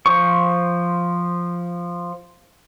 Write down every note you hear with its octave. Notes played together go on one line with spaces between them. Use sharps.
F3 C5 C#6